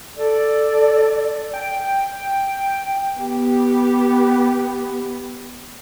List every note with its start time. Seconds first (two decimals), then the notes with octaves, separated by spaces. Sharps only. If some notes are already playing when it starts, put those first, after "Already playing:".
0.17 A4 D5
1.53 G5
3.20 B3 G4